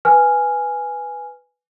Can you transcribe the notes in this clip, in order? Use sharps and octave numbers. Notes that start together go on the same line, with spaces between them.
B4 G#5 F6